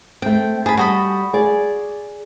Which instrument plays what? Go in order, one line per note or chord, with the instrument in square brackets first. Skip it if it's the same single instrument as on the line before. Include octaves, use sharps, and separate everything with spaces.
[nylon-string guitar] A3 C4 [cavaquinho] G5
[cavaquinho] G#4 B5 [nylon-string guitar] A5
[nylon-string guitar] G3 [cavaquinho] F#4 D#5 B5
[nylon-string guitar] G#4 D5